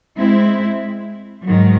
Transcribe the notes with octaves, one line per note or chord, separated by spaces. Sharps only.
G#3 C4 E4
G#2 D#3 F#3